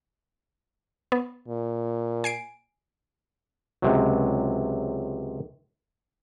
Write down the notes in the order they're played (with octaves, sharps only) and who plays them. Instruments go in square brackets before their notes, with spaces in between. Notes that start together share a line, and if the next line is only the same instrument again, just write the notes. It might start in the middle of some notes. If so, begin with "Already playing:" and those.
[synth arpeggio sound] B3
[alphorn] A#2
[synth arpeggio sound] G#5 C7 D7
[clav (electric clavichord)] C#2 C3 F#3